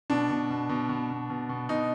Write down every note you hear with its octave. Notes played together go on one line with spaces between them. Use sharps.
B2 D4
B2
B2
B2
B2
B2
B2
B2
B2 D#4